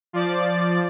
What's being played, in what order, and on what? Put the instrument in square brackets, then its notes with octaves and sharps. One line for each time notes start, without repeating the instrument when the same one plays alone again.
[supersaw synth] F3 D5 A6